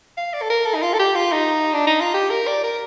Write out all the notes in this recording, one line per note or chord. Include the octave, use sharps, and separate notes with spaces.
F5
D5
A4
A#4
A4
D#4
F4
A4
G4
F4
D#4
D4
D#4
F4
G4
A#4
D5
A#4